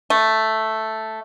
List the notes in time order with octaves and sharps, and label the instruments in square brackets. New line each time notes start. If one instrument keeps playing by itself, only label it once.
[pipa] A3